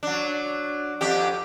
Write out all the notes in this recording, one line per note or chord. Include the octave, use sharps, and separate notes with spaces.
F#3 D4
F2 D4 G4